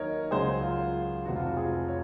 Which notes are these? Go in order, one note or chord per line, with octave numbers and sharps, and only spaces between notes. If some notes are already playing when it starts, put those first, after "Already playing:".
Already playing: D#2 D#3 F#3 A#4 C#5 D#5
C#2 C#3 F#3 G#4 C5
F4
F1 F2 C3 F#4
F4
F#4
F4 G#4
C#5